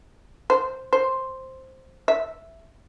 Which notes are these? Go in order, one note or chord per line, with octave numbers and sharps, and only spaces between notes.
C5
C5
E5